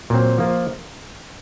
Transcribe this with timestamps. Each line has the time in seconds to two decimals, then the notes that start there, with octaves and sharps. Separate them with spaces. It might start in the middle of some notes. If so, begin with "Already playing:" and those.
0.10 A#2 F#3 C4
0.38 F3 A#3 F4